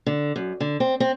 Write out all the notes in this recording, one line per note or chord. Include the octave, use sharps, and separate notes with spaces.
D3
F#2
D3
C4
C4